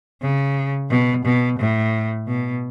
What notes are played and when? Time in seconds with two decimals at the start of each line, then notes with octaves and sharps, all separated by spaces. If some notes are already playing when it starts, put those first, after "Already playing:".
0.22 C#3
0.90 B2
1.25 B2
1.59 A2
2.27 B2